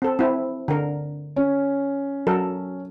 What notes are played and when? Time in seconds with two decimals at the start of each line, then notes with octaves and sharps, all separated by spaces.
0.02 C4 A4
0.19 C4 E4
0.68 D3 A#4
1.36 C#4
2.27 F#3 A4 A#4